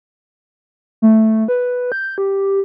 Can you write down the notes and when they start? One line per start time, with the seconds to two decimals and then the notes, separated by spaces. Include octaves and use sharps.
1.02 A3
1.48 B4
1.92 G6
2.18 G4